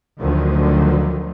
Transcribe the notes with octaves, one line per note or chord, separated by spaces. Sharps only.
D2 D3 D#3 F3 F#3